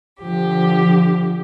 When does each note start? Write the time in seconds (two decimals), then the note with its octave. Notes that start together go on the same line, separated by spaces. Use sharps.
0.21 D3 F3 G4